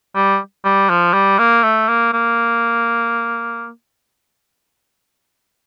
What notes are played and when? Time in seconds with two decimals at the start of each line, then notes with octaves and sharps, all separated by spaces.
0.15 G3
0.65 G3
0.90 F3
1.14 G3
1.39 A#3
1.63 A3
1.88 A#3
2.13 A#3